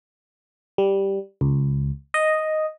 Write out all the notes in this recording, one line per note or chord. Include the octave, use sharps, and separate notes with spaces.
G3
C#2
D#5